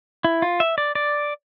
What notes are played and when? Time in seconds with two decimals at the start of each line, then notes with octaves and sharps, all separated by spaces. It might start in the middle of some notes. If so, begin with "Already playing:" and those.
0.24 E4
0.42 F4
0.60 E5
0.78 D5
0.95 D5